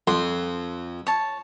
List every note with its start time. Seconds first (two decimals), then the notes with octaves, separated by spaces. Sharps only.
0.07 F2 C6
1.07 C#5 A5